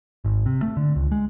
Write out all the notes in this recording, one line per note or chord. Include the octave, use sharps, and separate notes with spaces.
G#1
C3
A3
D3
C#2
G#3